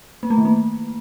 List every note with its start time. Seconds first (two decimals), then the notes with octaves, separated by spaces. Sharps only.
0.23 A#3
0.30 A3
0.38 D#3
0.45 A#3